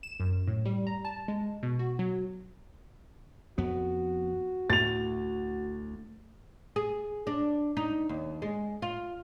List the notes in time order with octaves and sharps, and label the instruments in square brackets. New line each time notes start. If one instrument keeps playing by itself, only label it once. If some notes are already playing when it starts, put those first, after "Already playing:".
[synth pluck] E7
F#2
A2
G3
A#5
A5
G#3
B2
F#4
F#3
[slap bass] F2 B3 [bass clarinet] F#4
[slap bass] D2 A2 [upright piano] A6 F7
[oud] G#4
D4
D#4
D#2
G#3
F4